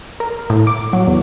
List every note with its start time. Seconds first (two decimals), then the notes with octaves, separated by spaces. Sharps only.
0.20 A#4
0.50 A2
0.67 D6
0.93 F#3
1.07 E2